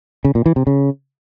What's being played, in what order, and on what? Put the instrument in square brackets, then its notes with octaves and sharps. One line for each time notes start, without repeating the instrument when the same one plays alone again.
[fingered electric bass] C#3
A#2
E3
C3
C#3